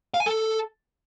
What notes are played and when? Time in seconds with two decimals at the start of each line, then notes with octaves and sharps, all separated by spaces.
0.14 F5
0.20 G#5
0.26 A4